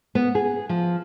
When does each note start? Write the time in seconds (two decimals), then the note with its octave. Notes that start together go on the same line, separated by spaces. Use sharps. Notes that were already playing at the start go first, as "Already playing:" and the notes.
0.15 B3
0.35 G#4
0.69 F3